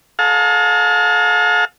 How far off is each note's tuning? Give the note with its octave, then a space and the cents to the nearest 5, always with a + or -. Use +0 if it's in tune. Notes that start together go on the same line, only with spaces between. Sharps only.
A4 -45 F5 +40 A5 +40